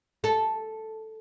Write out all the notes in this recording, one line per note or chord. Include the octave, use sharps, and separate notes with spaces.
A4